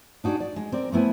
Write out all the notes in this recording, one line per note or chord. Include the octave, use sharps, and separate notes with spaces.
D4 D#4 F#4 G#4 D5
D5
G#3
C4 A#4 D5
A3 B3 E4 C5 G#5